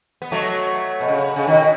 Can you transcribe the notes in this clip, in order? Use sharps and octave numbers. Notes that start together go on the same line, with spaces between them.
B3
F#3 A3
B2
C#3
C#3
B2 D#3